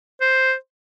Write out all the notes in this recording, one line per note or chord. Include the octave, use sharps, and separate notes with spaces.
C5